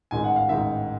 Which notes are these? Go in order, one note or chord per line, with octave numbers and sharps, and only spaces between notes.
A1 G#2 D#3 G#5
F#5
F5
A1 G#2 D#3 E5